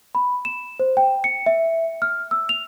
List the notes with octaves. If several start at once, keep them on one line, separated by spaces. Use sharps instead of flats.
B5
E7
C5
G5
C#7
E5
F6
E6
F7